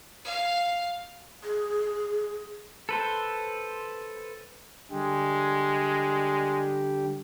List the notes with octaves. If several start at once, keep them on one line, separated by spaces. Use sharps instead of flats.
F5
G#4
A4 B4 C5
D3 G3 G#3 G4